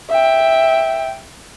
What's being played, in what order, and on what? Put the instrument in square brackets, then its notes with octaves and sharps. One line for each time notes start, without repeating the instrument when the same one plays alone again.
[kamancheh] E5 G5